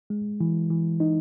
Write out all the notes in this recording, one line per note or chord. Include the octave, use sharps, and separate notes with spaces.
G#3
E3
E3
D#4